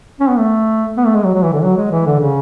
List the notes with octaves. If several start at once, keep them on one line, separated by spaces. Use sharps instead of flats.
C#4
B3
A3
B3
A3
G#3
F#3
F#3
E3
D3
F#3
G#3
E3
D3
C#3